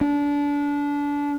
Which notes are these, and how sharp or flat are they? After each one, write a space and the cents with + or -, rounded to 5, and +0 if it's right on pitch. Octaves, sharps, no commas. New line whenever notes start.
D4 -25